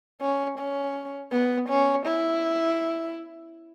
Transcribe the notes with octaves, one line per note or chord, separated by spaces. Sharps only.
C#4
C#4
B3
C#4
E4